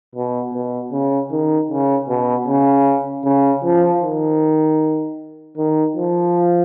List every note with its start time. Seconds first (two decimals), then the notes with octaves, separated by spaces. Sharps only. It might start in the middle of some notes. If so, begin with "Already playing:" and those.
0.15 B2
0.53 B2
0.92 C#3
1.32 D#3
1.70 C#3
2.09 B2
2.47 C#3
3.25 C#3
3.64 F3
4.02 D#3
5.57 D#3
5.96 F3